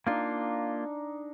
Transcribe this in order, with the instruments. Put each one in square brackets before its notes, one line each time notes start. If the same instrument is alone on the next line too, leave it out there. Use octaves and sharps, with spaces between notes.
[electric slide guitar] A#3 F4 [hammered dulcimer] D4 D#4 G#5